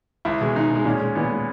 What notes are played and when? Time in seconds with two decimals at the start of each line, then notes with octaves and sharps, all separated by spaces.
0.25 C#2 E4
0.41 B2 G#3
0.56 C#2 D#4
0.70 B2
0.75 G#3
0.85 A#2 C#4
1.01 G#3
1.15 A#2 B3
1.31 G#3